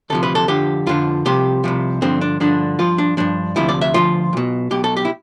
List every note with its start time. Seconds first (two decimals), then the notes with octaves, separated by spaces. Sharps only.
0.10 D2 C3 F3 A4
0.23 B4
0.35 A4
0.48 F2 D3 F3 G4
0.86 F2 D3 F3 F4
1.25 C2 C3 F3 G4
1.64 C2 C3 F3
2.02 G2 D3 F3 C4
2.21 D4
2.40 G2 D3 F3 D4
2.79 G2 F3 F4
2.98 D4
3.17 G2 F3 D4
3.56 D2 C3 F3 E4
3.69 D5
3.81 E5
3.94 D2 C3 F3 F4
4.33 B1 B2
4.71 B1 B2 G4
4.84 A4
4.97 G4
5.05 E4